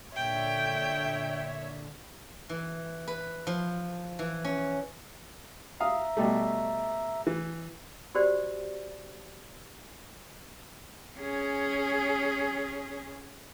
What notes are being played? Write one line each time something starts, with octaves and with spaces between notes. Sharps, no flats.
A#2 D3 C#5 E5 G5
E3
B4
F3
E3
C#4
E5 F5 A#5 D#6
B2 G3 A3
E3
F#4 G4 C5 D5
C#4 G#4